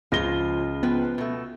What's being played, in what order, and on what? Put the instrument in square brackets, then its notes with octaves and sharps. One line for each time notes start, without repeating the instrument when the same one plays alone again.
[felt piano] C#2 [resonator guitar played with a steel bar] C#3 F3 [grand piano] F4 A#6 G7
[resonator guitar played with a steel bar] F3 B4 G5 [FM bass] B3
[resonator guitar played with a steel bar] B2 A3